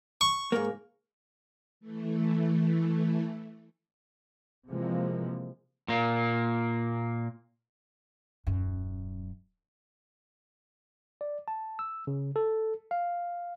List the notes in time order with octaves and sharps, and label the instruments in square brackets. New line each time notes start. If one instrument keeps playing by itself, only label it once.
[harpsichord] C#6
[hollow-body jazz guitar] G#2 A#3
[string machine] E3 A3
[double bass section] C3 E3 F3 G#3 A#3
[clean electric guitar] A#2 A#3
[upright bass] D#1 F#2
[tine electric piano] D5
A5
E6
C#3
A4
F5